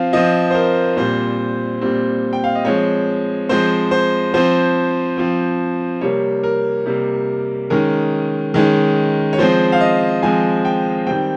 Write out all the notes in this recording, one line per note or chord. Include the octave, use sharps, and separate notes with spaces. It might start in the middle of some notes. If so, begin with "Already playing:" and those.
Already playing: F3 C4 F5
F3 C4 D#5
C5
A#4
A#2 G3 C4 C5
A#2 G3 C4
G5
F5
D#5
F3 G#3 C4 C#5
F3 G#3 C4 C5
C5
F3 C4 C5
F3 C4
C3 G3 A#3 C#5
A#4
C3 G3 A#3
D#3 G#3 C#4 A#4
D#3 G#3 C#4
C#5
F3 G#3 C4 C5
F5
D#5
F3 G#3 C4 G#5
G5
D#3 G3 C4 G5